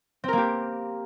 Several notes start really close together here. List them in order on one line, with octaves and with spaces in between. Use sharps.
C4 A#4 A#3 G4